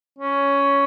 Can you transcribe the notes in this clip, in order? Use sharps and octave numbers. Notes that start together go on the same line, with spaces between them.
C#4